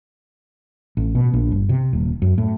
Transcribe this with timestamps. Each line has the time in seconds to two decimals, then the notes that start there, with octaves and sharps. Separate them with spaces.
0.97 A1
1.15 B2
1.33 A#1
1.52 G1
1.69 C3
1.93 D#1
2.22 F#2
2.38 A2